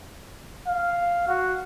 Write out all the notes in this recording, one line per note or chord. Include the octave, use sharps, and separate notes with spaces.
F5
F#4